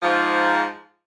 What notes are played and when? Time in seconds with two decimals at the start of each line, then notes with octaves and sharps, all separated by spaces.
0.02 G#2 F3